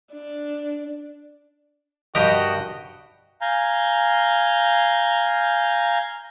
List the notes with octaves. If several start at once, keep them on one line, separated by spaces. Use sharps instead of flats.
D4
G2 F#4 G4 A#4 D#5 G5
F5 G#5 A#5 G6